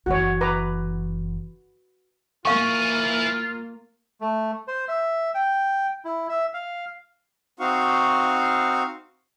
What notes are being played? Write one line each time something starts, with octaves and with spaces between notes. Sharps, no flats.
F#1 E3 F#4 C#5
B4 A#5 D6
A#3 E4 F4 F5 G#5 C#6
A3
C5
E5
G5
E4
E5
F5
C4 D#4 F#4 F5 C#6